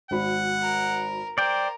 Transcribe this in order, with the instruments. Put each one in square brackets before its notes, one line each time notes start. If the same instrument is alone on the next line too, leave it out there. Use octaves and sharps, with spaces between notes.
[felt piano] G#1 F#4 B5 [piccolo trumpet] F#5
[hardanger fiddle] A#4
[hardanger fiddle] A#4 [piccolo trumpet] C5 [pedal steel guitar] D5 G5